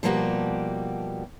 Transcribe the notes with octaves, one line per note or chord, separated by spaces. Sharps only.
B2 F3 G3 A#3 F#4 G4